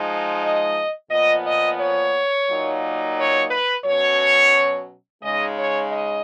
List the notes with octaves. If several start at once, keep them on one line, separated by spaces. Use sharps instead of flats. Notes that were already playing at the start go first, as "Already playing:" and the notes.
Already playing: F3 G#3 D#4
D#5
A#2 F3 B3 D#5
D#5
C#5
A#2 F#3 A#3 D#4
C#5
B4
B2 F#3 C#4 C#5
C#3 G#3 D#4 D#5
C#5
D#5